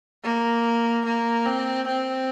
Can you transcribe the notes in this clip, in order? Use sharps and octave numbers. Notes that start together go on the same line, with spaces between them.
A#3
A#3
C4
C4